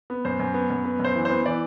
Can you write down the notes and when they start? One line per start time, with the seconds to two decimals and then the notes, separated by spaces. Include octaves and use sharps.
0.10 B3
0.25 F#2 C5
0.39 F#2
0.54 B3
0.70 F#2
0.84 B3 B4
1.00 F#2 C5
1.15 E3
1.25 B3 C5
1.45 E3 D5